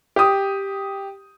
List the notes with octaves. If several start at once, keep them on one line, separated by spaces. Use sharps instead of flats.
G4 D#6